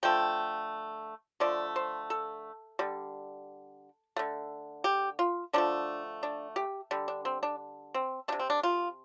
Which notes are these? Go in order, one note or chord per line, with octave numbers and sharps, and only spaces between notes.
D3 F3 A3 G5
D3 F3 A3 D5
C5
A4
D3 G3
D3 A3
G4
F4
D3 F3 A3 D4
D4
G4
D3 G3
D4
C4
D4
C4
C3 G3 D4
C4
D4
F4